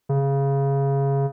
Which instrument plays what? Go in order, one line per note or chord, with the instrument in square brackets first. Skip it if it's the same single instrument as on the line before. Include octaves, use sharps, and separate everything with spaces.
[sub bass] C#3